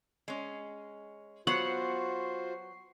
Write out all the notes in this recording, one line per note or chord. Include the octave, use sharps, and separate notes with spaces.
G#3 C#4
F#3 B3 F4 F#4 C5 F#5 C#6 C7